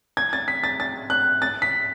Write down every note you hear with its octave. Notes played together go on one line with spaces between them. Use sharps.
G#6
A6
B6
A6
A6
F#6
A6
B6